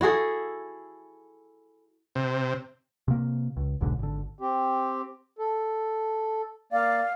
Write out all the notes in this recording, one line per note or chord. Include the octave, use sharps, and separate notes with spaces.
E4 F#4 G#4 A4
C3
C3 A#3
C#2
E1 B1 G#2 D3
G#1 D3
C4 G4
A4
A#3 D5 F5